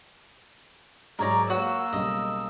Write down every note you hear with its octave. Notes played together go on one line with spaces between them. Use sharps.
G#2 F#3 A#4 C#5 D5 A#5
A#3 F#4 B4 C#5 E6
B1 C#3 G3 D#5